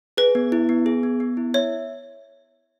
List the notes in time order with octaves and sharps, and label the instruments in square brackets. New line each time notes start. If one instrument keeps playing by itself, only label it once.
[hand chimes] G#4 [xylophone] B4
[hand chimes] B3
E4
B3
G#4
B3
B3
E4
[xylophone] C#5 [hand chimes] E5